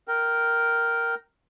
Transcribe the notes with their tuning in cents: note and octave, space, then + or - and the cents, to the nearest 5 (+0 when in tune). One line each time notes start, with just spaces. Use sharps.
A#4 +0 G5 -15